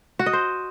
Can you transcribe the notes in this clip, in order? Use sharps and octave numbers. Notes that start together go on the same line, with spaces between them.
F#4
D#5
C5